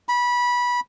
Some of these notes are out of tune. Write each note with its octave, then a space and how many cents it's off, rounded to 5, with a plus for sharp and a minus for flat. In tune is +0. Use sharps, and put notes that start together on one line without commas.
B5 -20